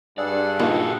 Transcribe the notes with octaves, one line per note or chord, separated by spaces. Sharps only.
G2 G#4 A4 D5 F#5
A#2 D#3 F3 A#3 F#4 G4